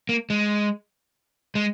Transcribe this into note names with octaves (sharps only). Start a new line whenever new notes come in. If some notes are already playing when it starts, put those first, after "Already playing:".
A#3
G#3
G#3